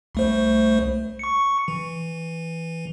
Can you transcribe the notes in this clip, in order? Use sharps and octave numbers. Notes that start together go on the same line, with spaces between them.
C2 A3 C5
C#6 C#7
E3